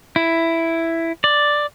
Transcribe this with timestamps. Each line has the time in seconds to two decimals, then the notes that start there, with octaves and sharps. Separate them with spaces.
0.16 E4
1.24 D5